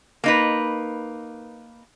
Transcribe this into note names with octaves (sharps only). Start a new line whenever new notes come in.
A#3 D#4 B4